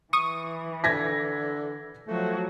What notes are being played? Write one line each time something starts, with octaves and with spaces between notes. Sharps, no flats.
E3 C#6 D#6
D3 G#6 A#6 B6
F3 F#3 A3 F#4